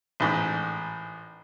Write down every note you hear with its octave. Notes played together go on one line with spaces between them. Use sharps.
A1 G#2